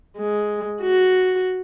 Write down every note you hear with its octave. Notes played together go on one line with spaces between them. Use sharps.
G#3
F#4